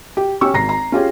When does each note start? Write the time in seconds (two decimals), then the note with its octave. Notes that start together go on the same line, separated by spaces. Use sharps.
0.17 G4
0.41 C#4 G4 C#6 E6
0.54 G#1 A#5 A#6 C7
0.69 A#5
0.92 C#4 F4 G4 G#4